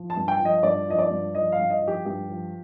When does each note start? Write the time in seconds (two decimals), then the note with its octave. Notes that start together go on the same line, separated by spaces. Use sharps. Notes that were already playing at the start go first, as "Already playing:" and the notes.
Already playing: F3
0.10 A5
0.16 G2
0.28 G5
0.40 F3
0.45 D#5
0.63 G2 D5
0.88 F3 D#5
0.99 D5
1.10 G2
1.35 F3 D#5
1.52 F5
1.58 G2
1.70 D#5
1.82 F3
1.88 G4
2.05 G2 G4
2.30 F3